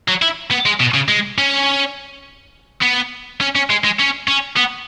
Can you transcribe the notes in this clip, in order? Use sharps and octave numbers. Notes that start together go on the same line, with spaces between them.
F#3
E4
B3
G#3
B2
C#3
G#3
C#4
B3
C#4
C#4
G#3
G#3
C#4
C#4
B3